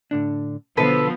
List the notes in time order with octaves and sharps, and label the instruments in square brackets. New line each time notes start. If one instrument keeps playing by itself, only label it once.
[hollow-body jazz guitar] A2 D3 D4
[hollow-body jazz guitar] B2 D3 [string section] F3 B3 [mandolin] A4 B4